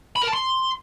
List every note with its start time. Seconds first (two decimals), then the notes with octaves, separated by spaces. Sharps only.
0.16 B5
0.22 A#4
0.28 A5
0.33 C6